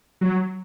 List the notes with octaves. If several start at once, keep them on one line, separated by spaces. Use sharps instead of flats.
F#3